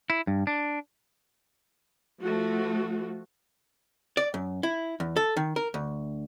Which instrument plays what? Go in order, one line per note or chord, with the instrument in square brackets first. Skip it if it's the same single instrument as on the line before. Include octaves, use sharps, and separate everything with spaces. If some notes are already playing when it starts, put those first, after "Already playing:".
[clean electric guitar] E4
G2
D4
[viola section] F3 A3 F#4
[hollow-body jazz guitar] D5
F#2
E4
E2
A4
D#3
A#4
D2